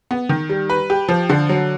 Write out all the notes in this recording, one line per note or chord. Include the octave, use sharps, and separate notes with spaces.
B3
D#3
G3
B4
G4
F3
D3
F#3